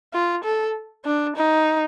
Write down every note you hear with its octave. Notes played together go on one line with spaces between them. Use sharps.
F4
A4
D4
D#4